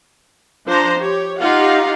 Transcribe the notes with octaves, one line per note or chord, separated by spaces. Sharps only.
F3 D4 C5 A#5
G4 C#5
D#4 F4 G4 F5 F#5